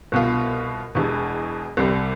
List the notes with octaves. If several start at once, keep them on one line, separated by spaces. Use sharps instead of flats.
C2 B2 B3 F4
E1 E2 B2
C2 C3 G3 C4